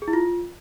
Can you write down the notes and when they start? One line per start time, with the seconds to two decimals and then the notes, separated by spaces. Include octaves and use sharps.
0.02 G#4
0.08 E4
0.13 F4